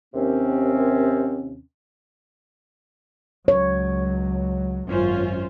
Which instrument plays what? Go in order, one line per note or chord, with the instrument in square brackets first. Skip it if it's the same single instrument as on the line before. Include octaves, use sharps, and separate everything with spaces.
[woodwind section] D#2 C3 C4 C#4
[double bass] C#2 F#3 [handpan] C#5
[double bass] G#1 F#2 [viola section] C#4 F4 C5